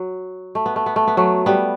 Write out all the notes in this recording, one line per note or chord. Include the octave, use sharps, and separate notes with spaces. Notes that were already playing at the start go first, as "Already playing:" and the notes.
Already playing: F#3
A3
B3
A3
B3
A3
B3
F#3 A3
G3 B3